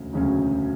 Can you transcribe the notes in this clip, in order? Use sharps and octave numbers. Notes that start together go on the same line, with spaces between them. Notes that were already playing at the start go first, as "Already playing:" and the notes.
Already playing: E1 D2 C#3 F#3 C#4
E1 D2 C#3 F#3 C#4